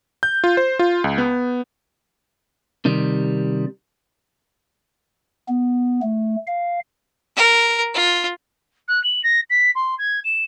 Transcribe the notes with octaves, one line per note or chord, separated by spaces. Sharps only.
G6
F4
C5
F4
C#2
B3
C3 D#3 G3
B3
A3
F5
A#4
F4
F#6
F#7
A#6
B6
C6
G#6
E7